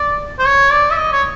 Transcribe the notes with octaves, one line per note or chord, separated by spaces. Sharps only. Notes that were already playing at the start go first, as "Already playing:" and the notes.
Already playing: D5
C5
C#5
D5
E5
D#5
C#5